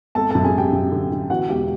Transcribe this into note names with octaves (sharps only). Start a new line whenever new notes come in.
G#1 A4 A5
F#2 A4 A5
G#4 G#5
G#1 G4 G5
F#2
D3
D3
E3 F#4 F#5
E1 G4 G5